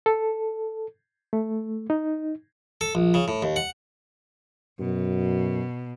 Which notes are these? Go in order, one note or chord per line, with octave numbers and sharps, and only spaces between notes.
A4
A3
D#4
A4
A#1
C#3
A2
D#2
F#5
F#2 B2